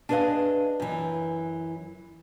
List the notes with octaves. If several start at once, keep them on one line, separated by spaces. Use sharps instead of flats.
D4 G#4 B4 D5 D#5 F5
F#2 E3